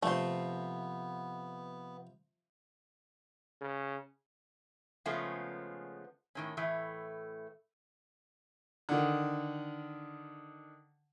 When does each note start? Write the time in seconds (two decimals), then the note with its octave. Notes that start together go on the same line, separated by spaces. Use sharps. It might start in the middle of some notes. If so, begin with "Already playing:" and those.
0.03 C3 F3 A3 B3 C5
3.61 C#3
5.06 C#3 F3 G#3 A3 B3 C#4
6.35 A2 D#3 C#4
6.57 A2 E3 A3
8.89 D3 D#3